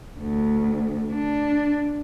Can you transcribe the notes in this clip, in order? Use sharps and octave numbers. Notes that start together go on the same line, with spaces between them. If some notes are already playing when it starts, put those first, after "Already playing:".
D2
D4